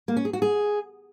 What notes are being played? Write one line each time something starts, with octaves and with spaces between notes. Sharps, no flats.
A#3
C#4
G#4
F#4
G#4